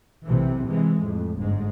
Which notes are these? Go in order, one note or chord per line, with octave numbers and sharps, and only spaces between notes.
B1 C3 E3
C3 E3 G#3
F2 A2
G1 G#2 G#3